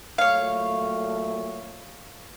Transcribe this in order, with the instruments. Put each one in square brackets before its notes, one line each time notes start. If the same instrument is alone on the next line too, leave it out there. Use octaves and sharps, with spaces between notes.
[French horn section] A#2 F#3 A3 [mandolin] C#5 F5